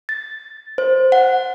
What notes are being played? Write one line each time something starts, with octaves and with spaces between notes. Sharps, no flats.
A6
C5
F#5